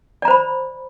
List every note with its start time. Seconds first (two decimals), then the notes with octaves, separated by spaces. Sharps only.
0.22 D5
0.25 A#5
0.28 C5
0.31 B5